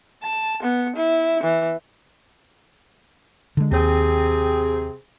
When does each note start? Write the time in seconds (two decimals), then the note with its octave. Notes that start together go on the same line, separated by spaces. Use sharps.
0.23 A5
0.63 B3
0.96 E4
1.43 E3
3.57 D3 G#3
3.71 D#2 C3 C4 G#4